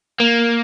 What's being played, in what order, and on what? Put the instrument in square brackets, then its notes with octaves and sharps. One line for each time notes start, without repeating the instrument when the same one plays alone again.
[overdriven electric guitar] A#3